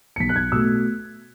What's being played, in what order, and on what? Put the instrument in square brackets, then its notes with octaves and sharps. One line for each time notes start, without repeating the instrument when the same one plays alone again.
[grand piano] C#7
B1 B6
F#6
G#6
B2 A3 E6